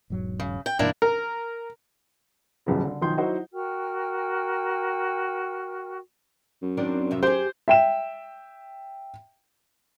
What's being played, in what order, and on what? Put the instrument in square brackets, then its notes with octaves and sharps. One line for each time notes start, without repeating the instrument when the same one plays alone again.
[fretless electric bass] E1 G#2 F#3
[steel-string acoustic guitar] C#3
G5
[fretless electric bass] G2 B2 E3 [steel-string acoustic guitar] A#3 D4 E4
[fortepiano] A#4
[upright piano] D#1 B1 C#3
D3
B1 D#3 F3 C6 G6
F#3 D#4 E4 F#4 C5 D#5
[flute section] F#4 A#4 G5 F6
[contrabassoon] F#2
[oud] D#3 C4 D4
F2 C3 E5
[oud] G4 G#4 [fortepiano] C5
[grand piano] E5 G5 E7